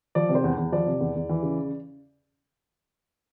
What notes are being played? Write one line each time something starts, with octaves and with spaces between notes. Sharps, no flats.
F3 D5
C3
C5
E2
E2
F3 D5
C3
E2
E2
E3
C#3